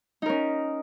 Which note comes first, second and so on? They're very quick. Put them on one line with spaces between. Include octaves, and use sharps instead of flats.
D#4 A#4 C#4